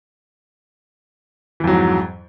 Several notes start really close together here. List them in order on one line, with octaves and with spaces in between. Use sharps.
E3 F2 F#3 G#2